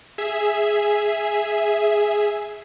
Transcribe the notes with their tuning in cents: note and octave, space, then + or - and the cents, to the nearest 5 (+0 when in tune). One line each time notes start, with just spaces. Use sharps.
G#4 +0 E5 +0